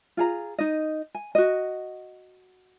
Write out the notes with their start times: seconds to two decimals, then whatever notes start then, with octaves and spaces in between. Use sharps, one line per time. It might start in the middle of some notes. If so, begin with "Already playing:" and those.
0.17 F4 G#4 A#5
0.58 D#4 D#5
1.14 G#5
1.35 F#4 D#5